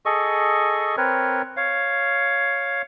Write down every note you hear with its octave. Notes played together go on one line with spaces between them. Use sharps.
G#4 A4 D#5 C#6
C4 A#4 B4 C#5
C#5 F5